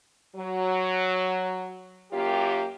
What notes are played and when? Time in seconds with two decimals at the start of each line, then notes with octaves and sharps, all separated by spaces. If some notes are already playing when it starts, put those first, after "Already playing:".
0.36 F#3
2.12 F#2 A#3 F4 G4